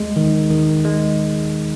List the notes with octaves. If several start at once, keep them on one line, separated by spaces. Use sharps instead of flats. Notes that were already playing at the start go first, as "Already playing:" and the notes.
Already playing: G#3
D#3
D#3
G#3